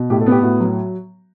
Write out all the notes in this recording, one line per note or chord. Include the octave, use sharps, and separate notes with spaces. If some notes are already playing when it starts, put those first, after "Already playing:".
Already playing: B2
A2 G4
A4
B3 G4
A2 F#4
F#3